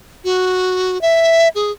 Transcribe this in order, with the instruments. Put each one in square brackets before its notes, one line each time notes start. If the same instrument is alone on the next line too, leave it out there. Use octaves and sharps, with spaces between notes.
[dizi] F#4
E5
G#4